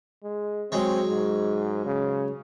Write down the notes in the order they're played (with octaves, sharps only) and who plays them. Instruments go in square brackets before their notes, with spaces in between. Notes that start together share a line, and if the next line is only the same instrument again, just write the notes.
[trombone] G#3
[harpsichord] F#3 G#3 C#5 [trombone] C4
[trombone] G#2
C#3